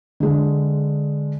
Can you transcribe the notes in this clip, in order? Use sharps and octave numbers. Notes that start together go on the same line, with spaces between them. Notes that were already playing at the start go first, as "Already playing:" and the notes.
D3 G#3